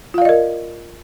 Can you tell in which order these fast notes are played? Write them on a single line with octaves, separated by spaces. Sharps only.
F4 F5 D5 D#5 A#4